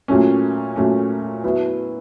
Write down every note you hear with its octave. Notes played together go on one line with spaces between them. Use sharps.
A#2 F#3 A3 C#4
A#2 F#3 A3 C#4
F#3 B3 E4